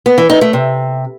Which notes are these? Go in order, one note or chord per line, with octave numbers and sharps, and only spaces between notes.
B3
E3
D#4
A3
C3